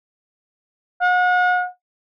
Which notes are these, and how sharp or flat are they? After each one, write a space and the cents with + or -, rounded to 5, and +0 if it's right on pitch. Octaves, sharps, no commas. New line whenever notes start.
F#5 -40